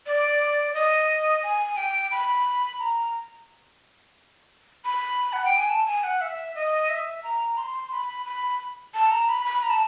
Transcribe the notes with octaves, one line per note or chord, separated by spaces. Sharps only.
D5
D#5
G#5
G5
B5
A#5
B5
F#5
G5
G#5
A5
G#5
F#5
E5
D#5
E5
A#5
C6
B5
B5
A5
A#5
B5
B5
A#5
A5